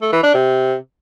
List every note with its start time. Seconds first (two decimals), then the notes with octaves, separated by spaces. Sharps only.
0.02 A3
0.12 E3
0.23 D4
0.34 C3